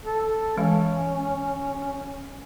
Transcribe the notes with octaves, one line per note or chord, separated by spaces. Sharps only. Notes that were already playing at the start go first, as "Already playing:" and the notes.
A4
E3 G#3 C#4 F5